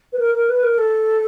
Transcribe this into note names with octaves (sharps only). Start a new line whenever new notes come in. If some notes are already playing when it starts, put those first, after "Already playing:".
B4
A#4
A#4
B4
A#4
A4